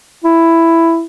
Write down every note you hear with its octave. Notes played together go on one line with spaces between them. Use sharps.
E4